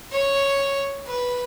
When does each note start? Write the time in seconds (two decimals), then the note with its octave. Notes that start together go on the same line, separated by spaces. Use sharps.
0.12 C#5
1.07 B4